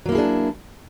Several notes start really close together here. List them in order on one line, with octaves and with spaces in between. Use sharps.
F#3 A#3 E4 G#4 D4